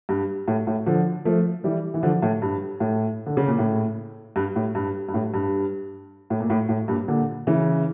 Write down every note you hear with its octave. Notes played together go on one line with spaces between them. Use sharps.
G2
A2
A2
D3 F3
F3 A3
E3 G3
E3
D3 F3
A2
G2
A2
D3
C#3
A#2
A2
G2
A2
G2
G2
A2
G2
A2
A#2
A2
A2
G2 A#2
A#2 D3
C#3 E3